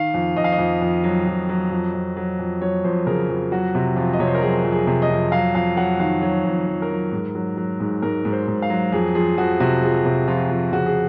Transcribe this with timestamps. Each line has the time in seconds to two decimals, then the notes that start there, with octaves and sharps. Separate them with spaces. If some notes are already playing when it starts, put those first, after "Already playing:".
Already playing: D#3 F5
0.14 F2
0.36 F2 D#5
0.44 F5
0.52 D#5
0.59 F2
0.82 F2
1.04 F#3
1.27 F2
1.49 F#3
1.71 F2
1.94 F2
2.17 F#3
2.39 F2
2.62 F#3 C#5
2.84 F2 C5
3.07 C#3 A#4
3.29 F2
3.52 F#3 F#4
3.75 C3
3.96 F2 F4
4.13 D#5
4.20 C3 C#5
4.27 C5
4.35 A#4
4.42 F#3 G#4
4.65 F2
4.72 G#4
4.87 C3
5.02 D#5
5.10 F2
5.32 F#3 F5
5.55 F2 F5
5.77 F#3 F#5
6.00 D#3 F5
6.22 F#3 C#5
6.45 F2
6.67 F2
6.82 A#4
6.90 F#3
7.12 G#2
7.35 F#3
7.57 F#3
7.80 G#2
8.02 G#2 A#4
8.25 G#2
8.32 C5
8.48 G#2
8.62 F5
8.70 F#3
8.92 F2 G#4
9.15 F3 G#4
9.38 F2 F#4
9.60 C3 F#4
9.83 F3 G#4
10.05 C3
10.28 F2 F4
10.50 F2
10.73 C#3 F#4
10.86 G#4